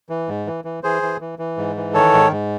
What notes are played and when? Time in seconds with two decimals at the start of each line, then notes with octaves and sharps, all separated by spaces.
0.10 E3
0.28 G#2
0.47 E3
0.65 E3
0.83 E3 G#4 C5
1.02 E3
1.21 E3
1.39 E3
1.57 G#2
1.76 E3
1.94 D#3 A4 C#5
2.14 G#2
2.31 G#2